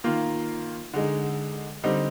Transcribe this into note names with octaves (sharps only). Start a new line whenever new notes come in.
D#3 A#3 F4
D3 G#3 D#4
D3 G3 C4 D#4